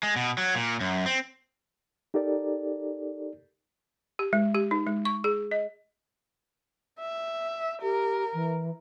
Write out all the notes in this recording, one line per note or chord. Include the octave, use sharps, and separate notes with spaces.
G#3
B2
F#3
A#2
F#2
C4
D#4 G4 A4 A#4 D5
G4
G#3
G4
D#4
G#3
C#6
G#4
D#5
E5
G4 A#4
E3